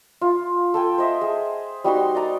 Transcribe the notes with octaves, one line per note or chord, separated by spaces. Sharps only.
F4
A4 G5 G#5
C5 D#5 E5
G#4
G3 D#4 F#4 C6
D5 D#5 A#5 D6